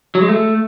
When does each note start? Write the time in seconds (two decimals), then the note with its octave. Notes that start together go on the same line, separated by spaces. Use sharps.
0.15 F#3
0.22 G#3
0.28 A3